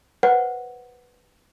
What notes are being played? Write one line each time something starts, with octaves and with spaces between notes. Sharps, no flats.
B4 C5 F#5